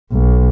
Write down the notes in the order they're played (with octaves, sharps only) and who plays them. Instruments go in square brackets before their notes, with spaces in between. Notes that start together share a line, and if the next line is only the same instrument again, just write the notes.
[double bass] B1